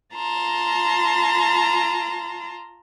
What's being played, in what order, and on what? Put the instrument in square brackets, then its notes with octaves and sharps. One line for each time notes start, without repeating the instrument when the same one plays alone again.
[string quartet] F4 A5 A#5 C6